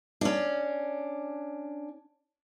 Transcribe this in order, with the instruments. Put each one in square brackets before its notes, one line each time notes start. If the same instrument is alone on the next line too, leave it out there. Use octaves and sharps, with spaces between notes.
[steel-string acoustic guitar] C#4 D4